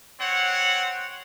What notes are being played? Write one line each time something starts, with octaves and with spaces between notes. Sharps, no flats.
C4 C#5 F#5